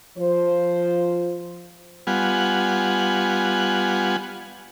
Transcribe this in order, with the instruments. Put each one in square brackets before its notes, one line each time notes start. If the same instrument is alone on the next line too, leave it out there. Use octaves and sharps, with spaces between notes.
[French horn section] F3 C5
[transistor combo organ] G3 B3 F4 F#5 G#5